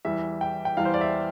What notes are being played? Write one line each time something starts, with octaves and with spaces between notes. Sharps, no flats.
E2 E3 G3 E5
G5
G5
E2 E3 G3 F5
C5
D5
E5